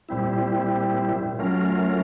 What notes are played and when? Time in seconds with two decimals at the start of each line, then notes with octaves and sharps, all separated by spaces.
0.09 A#2 G3 C4 E4
1.38 F#3 A3 C#4 F4 A#4